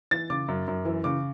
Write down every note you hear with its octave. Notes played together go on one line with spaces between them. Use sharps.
E3 A6
C#3 D6
F#2
F#2
E3
C#3 D6